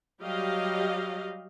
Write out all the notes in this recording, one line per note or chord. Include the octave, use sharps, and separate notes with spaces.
F#3 G3 G4 D#5 F5